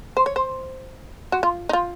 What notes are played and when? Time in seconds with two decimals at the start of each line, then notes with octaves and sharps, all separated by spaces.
0.17 C5
0.26 C#5
0.36 C5
1.32 F#4
1.43 F4
1.69 D#4
1.73 F4